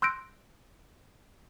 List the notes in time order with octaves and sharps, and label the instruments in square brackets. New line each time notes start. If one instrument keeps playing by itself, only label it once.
[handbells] C6 E6 F#6 G6 A#6 D7